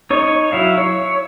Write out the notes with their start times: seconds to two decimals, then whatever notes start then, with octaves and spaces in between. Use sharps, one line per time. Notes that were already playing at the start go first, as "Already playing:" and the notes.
0.10 D#4 C#5 C#6
0.52 F#3 E4 F5
0.78 C#5